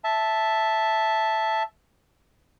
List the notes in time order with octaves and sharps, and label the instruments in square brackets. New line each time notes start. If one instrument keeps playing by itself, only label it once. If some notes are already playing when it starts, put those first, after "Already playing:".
[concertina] E5 A5